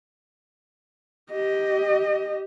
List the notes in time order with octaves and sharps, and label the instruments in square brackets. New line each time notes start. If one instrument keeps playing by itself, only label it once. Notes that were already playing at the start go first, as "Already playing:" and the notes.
[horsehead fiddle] G4 D#5